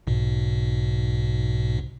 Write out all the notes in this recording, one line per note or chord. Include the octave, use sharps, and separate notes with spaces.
B1 G#2 B2